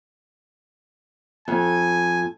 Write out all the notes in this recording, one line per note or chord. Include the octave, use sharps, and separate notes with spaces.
F2 G#5